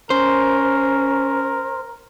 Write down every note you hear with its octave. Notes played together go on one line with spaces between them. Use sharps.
C#4 A#4 C5